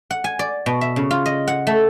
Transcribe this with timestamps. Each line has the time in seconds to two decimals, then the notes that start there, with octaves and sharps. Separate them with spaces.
0.10 F#5
0.24 G#5
0.39 D5
0.66 B2
0.81 E5
0.96 C#3
1.11 F4
1.26 D#5
1.48 F#5
1.67 A3